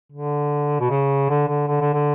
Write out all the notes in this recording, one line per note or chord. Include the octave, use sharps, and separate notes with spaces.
D3
B2
C#3
D3
D3
D3
D3
D3